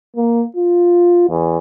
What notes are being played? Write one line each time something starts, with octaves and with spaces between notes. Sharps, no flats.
A#3
F4
E2